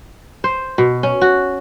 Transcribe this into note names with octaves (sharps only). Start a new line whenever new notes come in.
C5
B2
C#4
F#4